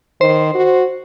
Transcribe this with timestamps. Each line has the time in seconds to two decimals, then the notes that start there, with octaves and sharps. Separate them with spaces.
0.21 D#3 C5
0.54 F#4